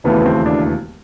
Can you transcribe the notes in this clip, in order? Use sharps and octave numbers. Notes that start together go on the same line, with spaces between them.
E1 D#2 C#3 E3 A3 B3
B3
C4
D4